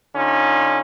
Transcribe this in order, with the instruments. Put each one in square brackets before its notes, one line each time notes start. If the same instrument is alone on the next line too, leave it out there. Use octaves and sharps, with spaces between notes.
[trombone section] D3 C#4 D#4 F4